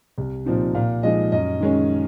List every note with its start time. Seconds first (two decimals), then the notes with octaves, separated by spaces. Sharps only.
0.18 C2
0.46 A#2 F3 C4 D#4
0.75 A#2 F5
1.03 F3 G#3 D#4 D#5
1.32 F#2 D#5
1.60 D#3 G#3 C#4